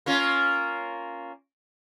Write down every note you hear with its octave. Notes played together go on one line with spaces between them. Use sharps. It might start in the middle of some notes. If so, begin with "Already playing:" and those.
A#3 C#4 F4